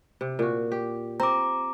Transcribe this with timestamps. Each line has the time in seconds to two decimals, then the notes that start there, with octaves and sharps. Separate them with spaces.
0.21 C3
0.39 A#2 F#4
0.72 G4
1.20 C4 A#5 D6